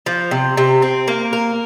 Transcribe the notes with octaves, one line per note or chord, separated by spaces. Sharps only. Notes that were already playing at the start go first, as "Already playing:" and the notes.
F3
C3
C3
C4
A#3
A#4